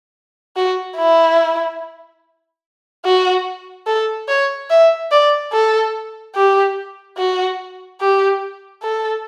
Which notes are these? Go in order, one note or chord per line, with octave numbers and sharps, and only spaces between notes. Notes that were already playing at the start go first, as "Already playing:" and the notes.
F#4
E4
F#4
A4
C#5
E5
D5
A4
G4
F#4
G4
A4